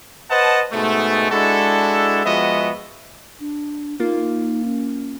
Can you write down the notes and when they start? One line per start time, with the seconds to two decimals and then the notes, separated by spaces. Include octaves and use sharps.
0.30 B4 C5 D#5 F#5 A5
0.72 G#2 B2 G#3 A3
1.31 G#3 D4 E4 F#4 A4
2.25 F3 G#3 B3 F#4 D#5 E5
3.40 D4
4.00 A#3 D#4 F4
4.64 C#4